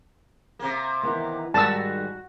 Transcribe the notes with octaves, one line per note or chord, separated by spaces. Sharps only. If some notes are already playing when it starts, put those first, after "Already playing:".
C3 A#3
D#3 E3 B3
G#2 D#3 G3 F#4 A5 E6